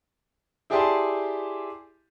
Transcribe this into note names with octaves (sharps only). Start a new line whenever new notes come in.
E4 G4 G#4 D5 A5 C6